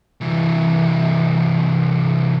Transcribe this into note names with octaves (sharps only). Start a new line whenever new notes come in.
C2 E3